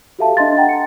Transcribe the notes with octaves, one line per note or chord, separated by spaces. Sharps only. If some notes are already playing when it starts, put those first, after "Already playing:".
F#4 G4 A4 E5 F5 A5
D4 D#5 C6 A6
F#5 G5 A#5
C#7